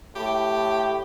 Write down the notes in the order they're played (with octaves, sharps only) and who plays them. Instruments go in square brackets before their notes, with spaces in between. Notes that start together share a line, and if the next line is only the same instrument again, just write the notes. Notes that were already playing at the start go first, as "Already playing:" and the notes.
[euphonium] A2 [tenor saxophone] G4